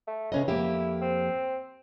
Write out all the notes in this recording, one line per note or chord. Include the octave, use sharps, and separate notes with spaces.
A3
C#2 C#3 C#4 D#5
F2 A#3 E4 G4
C4